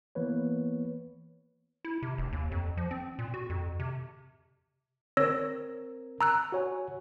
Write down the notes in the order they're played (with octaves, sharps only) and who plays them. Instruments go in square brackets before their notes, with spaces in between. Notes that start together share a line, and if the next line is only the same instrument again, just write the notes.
[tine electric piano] E3 A#3 B3 B4 C#5
[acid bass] E4
C3
F1
D#2
F2
F3
C4
A#2
F#4
F2
C3
[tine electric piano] C4 A#4 [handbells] C#5 E6 A#6
[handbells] A#5 E6 F#6
[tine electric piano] F#4 C#5 G#5